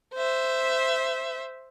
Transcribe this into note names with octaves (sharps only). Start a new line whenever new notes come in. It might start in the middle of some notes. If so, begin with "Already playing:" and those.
C5 E5